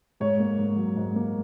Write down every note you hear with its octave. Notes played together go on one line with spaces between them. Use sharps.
G#2 C#5
A#3
G#2
F#3
G#2
A#3